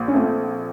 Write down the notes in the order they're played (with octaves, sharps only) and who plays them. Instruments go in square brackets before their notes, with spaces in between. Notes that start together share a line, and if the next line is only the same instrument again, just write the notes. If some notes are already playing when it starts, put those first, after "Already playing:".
Already playing: [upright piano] A#1 A#2
[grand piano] C#4
[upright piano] A3 [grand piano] C4